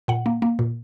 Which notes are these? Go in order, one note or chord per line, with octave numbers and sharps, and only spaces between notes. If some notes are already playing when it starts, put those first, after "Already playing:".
A#2 F#5
A#3
A#3
A#2